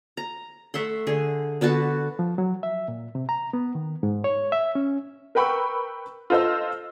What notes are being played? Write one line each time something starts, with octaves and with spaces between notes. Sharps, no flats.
A#5
A3 E5 F#5 C6
D3 G#4
D3 B3 F#4 A5
F3
F#3
E5
A#2
C3
A#5
B3
D#3
G#2
C#5
E5
C#4
A#4 B4 G5 B5 C#6 E6
F4 A4 C5 D#5 E6